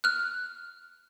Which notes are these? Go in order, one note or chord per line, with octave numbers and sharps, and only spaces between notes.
F6 F#6